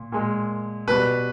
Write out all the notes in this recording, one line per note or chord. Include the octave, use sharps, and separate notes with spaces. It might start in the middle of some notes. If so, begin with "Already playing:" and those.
Already playing: A#2
A#2 G#3
B2 G3 B4